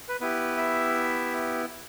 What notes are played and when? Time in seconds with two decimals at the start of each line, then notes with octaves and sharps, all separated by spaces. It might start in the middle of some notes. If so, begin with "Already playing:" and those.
0.08 B4
0.20 B3 E4 G4 B4
0.57 E5